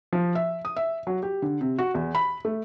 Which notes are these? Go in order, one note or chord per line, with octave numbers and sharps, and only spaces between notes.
F3
E5
D#6
E5
F#3
G4
D3
C3
F#4
E2
B5
A3